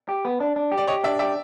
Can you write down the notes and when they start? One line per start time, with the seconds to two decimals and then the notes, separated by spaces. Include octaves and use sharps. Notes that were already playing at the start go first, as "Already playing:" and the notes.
0.09 G4
0.25 B3
0.40 D4
0.56 D4
0.72 G4
0.77 D5
0.87 G4 C#5 D#5
1.04 D4 D5 E5
1.19 G4 D5 E5